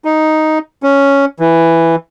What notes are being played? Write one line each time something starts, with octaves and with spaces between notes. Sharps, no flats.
D#4
C#4
E3